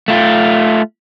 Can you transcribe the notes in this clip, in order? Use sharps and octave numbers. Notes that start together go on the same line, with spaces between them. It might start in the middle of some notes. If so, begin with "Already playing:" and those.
A3 F4